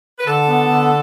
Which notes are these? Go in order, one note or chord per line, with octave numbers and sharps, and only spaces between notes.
B4
D3 A4
B3
D3